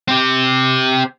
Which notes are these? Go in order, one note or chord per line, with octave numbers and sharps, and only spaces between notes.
C4 G4